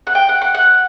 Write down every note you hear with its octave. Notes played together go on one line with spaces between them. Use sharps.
F#5
G5
F#5
F#5
F#5